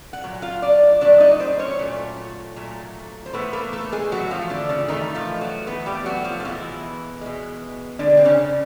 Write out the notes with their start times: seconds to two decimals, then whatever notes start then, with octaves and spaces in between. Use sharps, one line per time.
0.13 F#5
0.24 A#2 F#3
0.42 F4 F5
0.62 D4 D5
1.01 A#2 F#3 A3 D4 D5
1.20 D#4 D#5
1.40 C4 C5
1.59 C#4 C#5
1.79 A#2 F#3 A3
2.56 A#2 F#3 A3
3.26 C5
3.33 A2 E3 A3 B3 B4
3.53 A#3 A#4
3.73 A3 A4
3.92 G#3 G#4
4.12 A2 E3 F#3 A3 F#4
4.31 F3 F4
4.50 D3 D4
4.69 C#3 C#4
4.88 A2 D#3 E3 A3 D#4
5.15 F3 F4
5.41 F#3 F#4
5.67 A2 E3 A3 B3 B4
5.86 G3 G4
6.06 F#3 F#4
6.24 F3 F4
6.40 F4
6.44 B2 E3 G#3 E4
7.21 B2 G#3
7.99 B2 D3 G#3 D4
8.17 C4
8.25 C#3 C#4